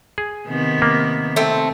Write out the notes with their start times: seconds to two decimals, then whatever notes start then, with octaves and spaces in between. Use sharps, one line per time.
0.18 G#4
0.47 C3 D#3 B3
0.82 A#3
1.36 A3 C4